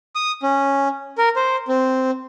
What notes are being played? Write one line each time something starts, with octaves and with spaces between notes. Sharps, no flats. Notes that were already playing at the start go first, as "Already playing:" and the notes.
D#6
C#4
A#4
C5
C4